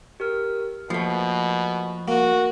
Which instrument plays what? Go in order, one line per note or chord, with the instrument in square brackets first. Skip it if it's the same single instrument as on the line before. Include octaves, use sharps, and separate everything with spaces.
[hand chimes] G4 A#4 F6
[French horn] B2 [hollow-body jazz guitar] F3 A3 [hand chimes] A#3 A6
[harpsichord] A#3 [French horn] F#4